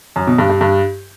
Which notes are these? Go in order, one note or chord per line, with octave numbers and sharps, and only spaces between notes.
F#2
B2
G2
G2
G2